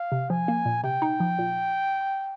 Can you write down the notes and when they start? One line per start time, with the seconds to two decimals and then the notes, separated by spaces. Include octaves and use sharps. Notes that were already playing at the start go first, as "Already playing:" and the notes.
Already playing: F5
0.12 C3
0.30 F3 G#5
0.48 A#3
0.66 A#2
0.84 C3 G5
1.02 D#4
1.20 F3
1.38 A#2